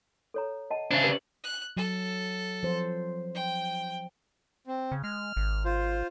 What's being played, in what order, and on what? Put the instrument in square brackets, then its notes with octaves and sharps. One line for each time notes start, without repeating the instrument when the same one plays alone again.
[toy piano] A4 C#5 A#5
D#5 F#5 A5
[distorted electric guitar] C#3 D4 [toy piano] C5 E5
[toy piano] G4 B4
[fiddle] F#6
[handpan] F#3 [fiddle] A4
[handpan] F3 C5
[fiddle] G5
[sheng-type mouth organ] C4
[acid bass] C#3
[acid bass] G#3 [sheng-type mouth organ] F6
[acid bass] G#1
[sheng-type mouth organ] F4 C5